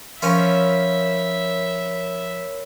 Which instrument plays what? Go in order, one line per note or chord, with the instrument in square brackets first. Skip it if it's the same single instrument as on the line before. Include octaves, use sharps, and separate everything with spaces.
[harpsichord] F3 C#4 F4 [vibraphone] A#4 C#5 B5 [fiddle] E5